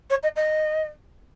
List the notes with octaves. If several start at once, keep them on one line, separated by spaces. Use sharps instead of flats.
C#5
D#5
D#5